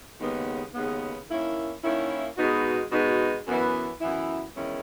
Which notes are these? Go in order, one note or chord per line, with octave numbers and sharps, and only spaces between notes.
D#2 C#3 G#3 B3
D#2 C#3 G#3 B3
D#3 A#3 C#4 E4
D#3 A#3 C#4 E4
B2 G#3 B3 D#4 F#4
B2 G#3 B3 D#4 F#4
F#2 E3 B3 E4
F#2 E3 B3 E4
E2 D#3 G#3 C#4 E4